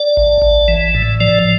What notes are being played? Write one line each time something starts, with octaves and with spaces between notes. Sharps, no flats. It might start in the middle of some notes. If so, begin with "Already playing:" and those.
Already playing: D5
A1
A1
E3
A2
F3 D5